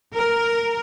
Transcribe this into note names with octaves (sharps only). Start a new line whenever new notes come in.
A#4